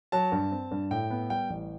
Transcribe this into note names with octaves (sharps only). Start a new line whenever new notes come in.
F#3 A5
G2
C4
G2
A2 G5
B3
G3 G5
A1